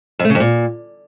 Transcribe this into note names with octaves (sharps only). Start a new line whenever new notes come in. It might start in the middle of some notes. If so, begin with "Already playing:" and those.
F2
A3
C#3
F2
A#2